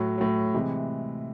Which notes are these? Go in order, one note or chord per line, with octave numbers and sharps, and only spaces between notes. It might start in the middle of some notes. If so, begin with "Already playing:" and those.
Already playing: A2 F#3
A2 F#3
C3 E3 G#3